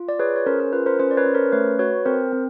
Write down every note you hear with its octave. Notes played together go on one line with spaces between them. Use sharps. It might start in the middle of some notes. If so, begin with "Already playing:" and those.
Already playing: F4
D5
G#4 B4 C#5
C#5
C#4 A#4 C5
A#4
F4 B4
A#4 C5
C#4 A#4 C5
D5
B4 C#5
C#4
A#4 C5
A3 B4 C#5
F#4 B4 C#5
C4 A#4 C5
C4